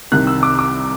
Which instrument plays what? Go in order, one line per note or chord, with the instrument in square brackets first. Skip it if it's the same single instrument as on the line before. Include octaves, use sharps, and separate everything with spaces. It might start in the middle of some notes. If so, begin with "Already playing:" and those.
[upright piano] C2 C3 D#3 F#6
E6
D6
D6